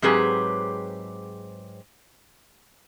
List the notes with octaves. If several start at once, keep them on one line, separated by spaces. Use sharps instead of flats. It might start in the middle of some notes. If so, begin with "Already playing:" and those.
G#2 F#3 C4 G4 G#4 B4